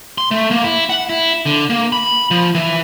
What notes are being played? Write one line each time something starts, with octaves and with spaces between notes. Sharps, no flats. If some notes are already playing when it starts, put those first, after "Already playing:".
C6
A3
A#3
E4
F#5
E4
D3
A#3
B5
F3
E3